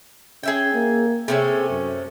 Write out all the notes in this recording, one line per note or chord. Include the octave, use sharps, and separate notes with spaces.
C#4 G#4 E5 G5
A#3
C3 A3 C#4 G#4
F#2